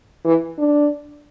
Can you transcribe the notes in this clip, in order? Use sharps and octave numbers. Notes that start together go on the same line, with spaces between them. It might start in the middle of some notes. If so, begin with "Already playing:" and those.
E3
D4